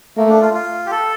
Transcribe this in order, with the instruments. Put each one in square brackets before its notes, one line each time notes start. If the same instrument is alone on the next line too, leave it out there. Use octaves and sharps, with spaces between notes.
[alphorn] A3 [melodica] A#3
[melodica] D4
F4
F4
G4
A4